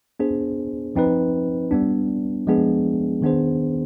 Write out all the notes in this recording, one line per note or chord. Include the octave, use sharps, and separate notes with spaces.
B3 D4 G#4 C5
F3 C4 D#4 B4
G3 B3 D4
F3 G#3 B3 D4 G#4
D#3 B3 D4 G#4 C5